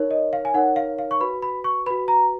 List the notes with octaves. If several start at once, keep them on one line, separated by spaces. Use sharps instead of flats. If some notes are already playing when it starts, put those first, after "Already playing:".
Already playing: D#4 A#4 C#5
D#5
F5
G#5
D#4 A#4 C#5 F#5
F5
F5
C#6
F#4 B4 B5
B5
C#6
F#4 B4 B5
A#5